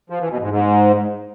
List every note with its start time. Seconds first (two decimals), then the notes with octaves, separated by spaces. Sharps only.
0.10 F3
0.20 E3
0.30 B2
0.41 G#2
0.51 G#2